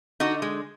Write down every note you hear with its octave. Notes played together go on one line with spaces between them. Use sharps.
D3 D#4 F#4
G#3